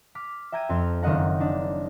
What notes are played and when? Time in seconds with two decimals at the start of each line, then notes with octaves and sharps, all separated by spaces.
0.15 D6 F6 B6
0.52 E5 G5 A#5 G#6 D7 D#7
0.69 F2 C4 F6
1.02 F#1 D#3 C4 D#5 F#5 A#5
1.40 D4 D#4